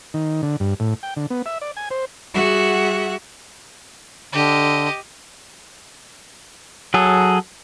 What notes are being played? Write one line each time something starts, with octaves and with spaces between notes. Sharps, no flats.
D#3
D3
G2
A2
G5
D3
B3
E5
D5
G#5
C5
G3 F#4 G#4 E5 F#5
D3 G4 D#5
F#3 G#4 A4